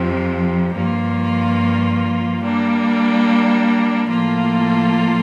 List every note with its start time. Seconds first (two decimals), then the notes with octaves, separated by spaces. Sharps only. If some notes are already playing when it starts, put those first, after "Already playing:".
Already playing: F2 C3 F3
0.74 G2 F3 A#3 F4
2.41 G3 A#3 D4
4.08 A2 F3 A#3 F4 A4